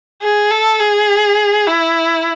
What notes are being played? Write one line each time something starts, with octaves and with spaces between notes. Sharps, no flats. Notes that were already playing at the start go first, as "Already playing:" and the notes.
G#4
A4
G#4
E4